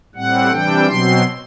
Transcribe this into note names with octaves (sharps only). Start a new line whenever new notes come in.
A2 G3 C4 F#5
C3 E3 G3 D4 G5
B2 F#3 C4 C6